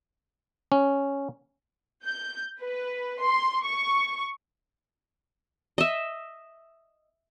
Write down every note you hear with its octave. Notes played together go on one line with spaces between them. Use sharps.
C#4
G6
B4
C6
C#6
D#5 E5